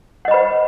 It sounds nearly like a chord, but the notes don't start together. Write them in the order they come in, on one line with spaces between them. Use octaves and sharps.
F#5 D#5 B5 C5